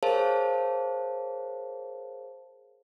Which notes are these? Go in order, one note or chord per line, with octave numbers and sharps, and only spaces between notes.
G#4 A#4 C5 C#5 F5 A5